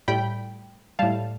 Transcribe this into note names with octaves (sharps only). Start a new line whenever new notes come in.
A2 G3 G5 B5
A2 G3 F5 A5